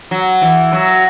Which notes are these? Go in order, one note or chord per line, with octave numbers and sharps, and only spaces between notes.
F#3
E3
F#3